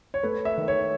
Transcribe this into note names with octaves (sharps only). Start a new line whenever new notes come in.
C#5
A3 B4
E5
D#3
C#5